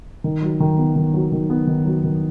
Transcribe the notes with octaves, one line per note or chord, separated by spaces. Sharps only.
D#3
F#3
D#3
B3
D#3
F#3
D#3
B3
D#3
F#3
D#3